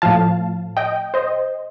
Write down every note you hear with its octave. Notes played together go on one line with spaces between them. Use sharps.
A2 F3 F5 A5
D#5 G5
C5 D#5